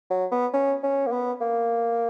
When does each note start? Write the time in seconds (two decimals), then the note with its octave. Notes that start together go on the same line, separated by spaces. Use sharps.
0.10 F#3
0.32 B3
0.54 C#4
0.83 C#4
1.07 A#3
1.13 B3
1.41 A#3